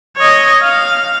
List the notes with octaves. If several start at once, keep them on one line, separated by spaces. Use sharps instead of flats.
C#5 D#5
F5